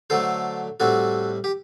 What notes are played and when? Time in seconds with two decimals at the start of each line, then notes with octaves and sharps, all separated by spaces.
0.10 D3 F#3 A3 A4 C5
0.80 A2 G3 C4 F#4 A4
1.44 G4